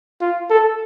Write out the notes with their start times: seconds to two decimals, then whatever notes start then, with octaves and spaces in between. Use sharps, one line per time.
0.21 F4
0.50 A4